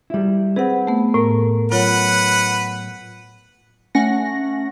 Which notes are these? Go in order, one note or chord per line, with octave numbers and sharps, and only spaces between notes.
G3 E4
C4 G#4 B4 F#5
A3 B3
A2 A#4
F#3 F4 B4 C#5 F#5
A3 C#4 F#5 A#6